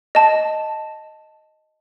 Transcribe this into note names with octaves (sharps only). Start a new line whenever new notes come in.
D#5 A5